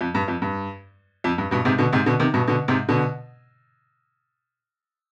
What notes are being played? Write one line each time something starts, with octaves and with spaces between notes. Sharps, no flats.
F2
G2
F2
G2
F2
G2
G2 B2
G#2 C3
B2 D3
G#2 C3
B2 D3
C3 D#3
G2 B2
B2 D3
G#2 C3
B2 D3